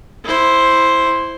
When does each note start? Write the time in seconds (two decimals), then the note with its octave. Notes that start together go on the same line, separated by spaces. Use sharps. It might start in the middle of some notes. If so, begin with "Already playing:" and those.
0.25 E4 C5